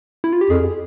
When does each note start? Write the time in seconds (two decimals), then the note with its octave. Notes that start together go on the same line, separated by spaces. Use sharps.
0.24 E4
0.33 F4
0.41 G4
0.50 F2 G#4